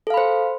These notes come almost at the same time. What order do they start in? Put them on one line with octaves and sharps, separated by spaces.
A4 F5 B5 C5